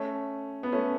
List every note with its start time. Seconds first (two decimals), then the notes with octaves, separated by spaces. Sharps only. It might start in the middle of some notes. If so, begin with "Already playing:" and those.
Already playing: A3 C#4
0.63 B3
0.72 A3 C#4